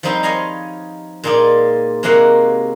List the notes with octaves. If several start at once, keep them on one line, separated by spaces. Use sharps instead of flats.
F3 G3 C4 D#4 C5 B5
C#5 D#5 F5 G#5 A#5 B5
A#2 G#3 D#4 F4 G#4 D5
C3 G#3 A#3 F#4 F5 F#5